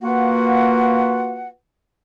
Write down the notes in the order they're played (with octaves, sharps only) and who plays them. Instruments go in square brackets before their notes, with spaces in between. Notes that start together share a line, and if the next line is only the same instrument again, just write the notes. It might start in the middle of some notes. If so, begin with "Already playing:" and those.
[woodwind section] A#3 F4 F#4 B4 F#5